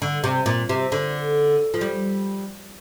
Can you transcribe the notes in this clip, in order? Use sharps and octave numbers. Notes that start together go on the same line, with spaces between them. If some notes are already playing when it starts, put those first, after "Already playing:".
D3
C3
A#2
C3
D3
F3
G3